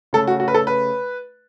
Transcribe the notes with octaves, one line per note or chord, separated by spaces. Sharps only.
C#3 A3 A4
F#4
F#4
B4
A4
B4